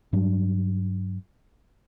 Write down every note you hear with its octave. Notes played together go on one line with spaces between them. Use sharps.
G2 F#3 D4